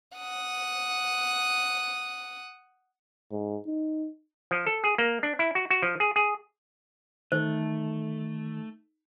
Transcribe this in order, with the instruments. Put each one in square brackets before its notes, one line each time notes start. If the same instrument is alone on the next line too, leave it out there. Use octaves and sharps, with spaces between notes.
[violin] F#5 D#6
[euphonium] G#2
D#4
[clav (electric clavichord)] F3
A4
G#4
A#3
D4
E4
F#4
F#4
F3
G#4
G#4
[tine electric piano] D#3 [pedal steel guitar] A3 [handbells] D#4 A4 [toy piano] C5